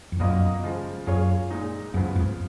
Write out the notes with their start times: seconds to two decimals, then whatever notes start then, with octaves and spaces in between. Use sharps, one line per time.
0.12 F2
0.20 F#2 B2 A#3 F4 A#4 D#5
0.64 C#3 F3 G#3
1.07 F#2 A#3 F4 G#4 C#5
1.50 A#2 G#3 D#4
1.94 F#2 C#3 F3 B3
2.16 F2 G#2